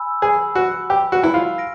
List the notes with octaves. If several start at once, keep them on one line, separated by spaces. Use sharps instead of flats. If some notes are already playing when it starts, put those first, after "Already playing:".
Already playing: G#5 B5 E6
G#4
F#4
G4
F#4
E4
F4
F6 A#6 D7